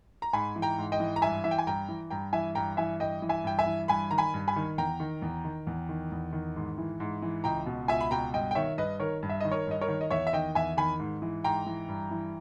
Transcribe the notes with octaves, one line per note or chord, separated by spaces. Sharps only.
A#5
G#2 G#5 B5
E3
G5 A#5
G#2
D#5 G5
E3
A#5
G2 E5 G#5
E3 E5
G5
G#5
G2 G5 A#5
E3
G2 G5 A#5
E3 E5 G#5
G2 G5 A#5
E3 E5 G#5
G2 D#5 G5
E3
E5 G#5
G2 G5
E5 G#5
E3
G2 G#5 B5
D#3 A#5
G#5 B5
G2
G#5 B5
D#3
E2 G5 A#5
D#3
E2
D#3
E2
D#3
E2
D#3
G#2
E3
G#2
E3
C#2 G5 A#5
B2
C#2 E5 G#5
B5
B2 G5 A#5
G2 D#5 G5
G5
D#3 C#5 E5
G2 B4 D#5
D#3 A#4 C#5
G2
E5
D#3 D#5
A#4 C#5
G2 D#5
A#4 C#5
D#3
D#5
E2 C#5 E5
E5
D#3 D#5 G5
E2 E5 G#5
D#3 G#5 B5
G#2
E3
G#2 G5 A#5
E3
G2
E3